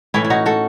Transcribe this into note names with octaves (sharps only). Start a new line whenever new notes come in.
A2 E3 C#4 E4
E4
D#4 F#4
F#4 A4